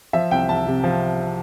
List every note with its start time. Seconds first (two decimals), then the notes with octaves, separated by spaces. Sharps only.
0.13 F3 E5
0.31 C2 G5
0.49 C2 A5
0.67 C3
0.84 F3